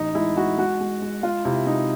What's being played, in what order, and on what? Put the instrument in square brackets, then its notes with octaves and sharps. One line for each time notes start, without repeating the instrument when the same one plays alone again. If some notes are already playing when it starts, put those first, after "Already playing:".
Already playing: [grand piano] A1 D#4
G#3 E4
G#3 F#4
G#3 F#4
G#3
G#3
G#3 F4
C3 E4
G#3 D#4